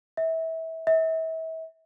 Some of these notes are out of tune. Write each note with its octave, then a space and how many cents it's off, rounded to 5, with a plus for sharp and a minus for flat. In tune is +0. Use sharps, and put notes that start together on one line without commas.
E5 -25
E5 -35